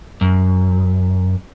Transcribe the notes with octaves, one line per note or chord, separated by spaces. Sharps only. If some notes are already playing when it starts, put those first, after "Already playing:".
F#2